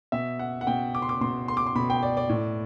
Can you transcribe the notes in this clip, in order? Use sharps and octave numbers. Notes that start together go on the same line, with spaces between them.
B2 E5
F#5
F#5
B2 G5
D6
C6
D6
B2 C6
C6
D6
C6
B2 B5
G5
D5
D5
A2